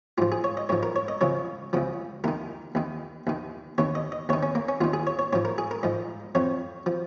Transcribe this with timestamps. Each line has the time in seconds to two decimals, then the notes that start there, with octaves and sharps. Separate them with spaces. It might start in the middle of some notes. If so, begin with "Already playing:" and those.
0.18 G#2 F3 F4
0.32 G#4
0.44 C#5
0.57 D#5
0.69 G#2 F3 C#5
0.83 A#4
0.96 C#5
1.08 D#5
1.21 C#2 C#3 F3 C#5
1.73 C#2 C#3 F3
2.24 D#2 D#3 A#4
2.75 D#2 D#3
3.27 D#2 D#3
3.78 D#2 D#3 C#5
3.95 D#5
4.12 D#5
4.29 D#2 D#3 C#5
4.43 C#4
4.55 A#3
4.69 C#4
4.81 D#2 D#3 F4
4.93 G#4
5.07 C#5
5.19 C#5
5.33 G#2 F3 C#5
5.45 A#4
5.58 G#4
5.71 A#4
5.83 G#2 F3 D#5
6.35 F2 F3 C#5
6.86 F3